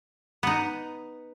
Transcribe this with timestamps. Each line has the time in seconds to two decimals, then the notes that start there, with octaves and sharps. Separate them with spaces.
0.43 B3 D#4